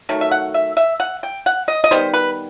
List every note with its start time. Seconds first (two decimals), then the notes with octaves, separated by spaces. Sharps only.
0.09 D#3 F#3 A3
0.21 E5
0.31 F#5
0.54 E5
0.77 E5
1.00 F#5
1.23 G5
1.46 F#5
1.68 D#5
1.84 D#5
1.91 D#3 G3 B3 C5
2.14 B4